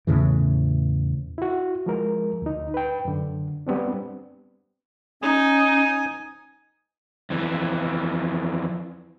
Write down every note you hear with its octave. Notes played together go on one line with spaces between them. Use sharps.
E2 A2 C#3 E3
E4 F#4
F3 G#3 A#4
D2 D#4
B4 G5
F#2 D3
G3 B3 C4 D4
C#4 D#4 G#5 D#6
F2 E3